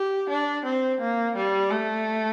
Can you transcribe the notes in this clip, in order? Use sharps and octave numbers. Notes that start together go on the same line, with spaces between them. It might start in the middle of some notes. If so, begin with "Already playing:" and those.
Already playing: G4
D4
C4
A#3
G3
A3